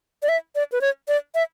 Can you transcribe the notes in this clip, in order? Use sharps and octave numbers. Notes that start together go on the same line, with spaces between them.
D5
E5
D5
B4
C#5
D5
E5